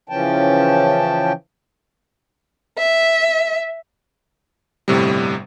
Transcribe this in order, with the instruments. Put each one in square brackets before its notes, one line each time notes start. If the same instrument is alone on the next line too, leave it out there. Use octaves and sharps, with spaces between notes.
[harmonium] C#3 E3 F3 C#4 G5 A5
[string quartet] E5
[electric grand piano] G1 A2 C3 G3